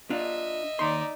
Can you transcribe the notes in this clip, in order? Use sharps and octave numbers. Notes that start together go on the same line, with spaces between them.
D4 F4 D#5 E5
D#2 D#4 D5 C6